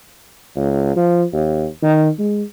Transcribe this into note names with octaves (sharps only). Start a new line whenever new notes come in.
C#2
F3
D#2
D#3
G#3